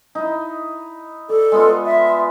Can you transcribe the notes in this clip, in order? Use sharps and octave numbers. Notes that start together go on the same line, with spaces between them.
D#4 E4
A4 D5
G#3 B3 F4
E5